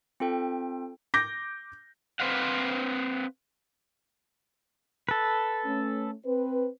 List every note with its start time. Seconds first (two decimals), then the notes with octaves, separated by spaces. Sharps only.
0.20 C4 F4 A4 G5
1.14 D6 G6 A#6
2.20 C4 B4 C5 F5 F#5
5.09 A4 B4
5.65 A3 C#4
6.25 C4 B4 C5